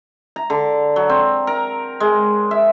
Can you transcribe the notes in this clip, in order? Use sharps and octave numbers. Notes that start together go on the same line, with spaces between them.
A#5
D3
F#3
C4
A#4
G#3
E5